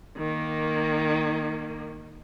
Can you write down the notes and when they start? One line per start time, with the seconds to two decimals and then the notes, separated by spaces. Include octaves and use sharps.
0.18 D#3 A#3